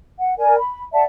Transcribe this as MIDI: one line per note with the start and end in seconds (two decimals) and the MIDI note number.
0.19 0.34 78
0.37 0.56 70
0.37 0.56 74
0.37 0.56 80
0.58 0.82 83
0.92 1.04 74
0.92 1.04 76
0.92 1.04 78
0.92 1.04 81